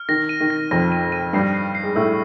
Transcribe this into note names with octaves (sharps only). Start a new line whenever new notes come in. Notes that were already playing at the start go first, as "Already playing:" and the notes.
Already playing: F6
D#3 A#6
D#7
D#3
A#6
F2 F3 A#6
D#7
D#7
G2 G3 C7
C7
C7
G#3
A2 A3 E6